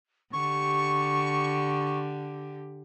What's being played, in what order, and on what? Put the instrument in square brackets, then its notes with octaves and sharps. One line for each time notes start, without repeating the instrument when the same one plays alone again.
[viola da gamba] D3 G4 [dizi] C#6